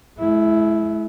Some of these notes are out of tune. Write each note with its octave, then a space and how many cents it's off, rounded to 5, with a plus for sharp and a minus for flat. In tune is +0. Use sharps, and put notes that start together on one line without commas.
G#3 +45 E4 +0